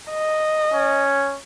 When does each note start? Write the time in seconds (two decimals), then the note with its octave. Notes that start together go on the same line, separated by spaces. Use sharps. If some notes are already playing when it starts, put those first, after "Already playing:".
0.10 D#5
0.74 C#4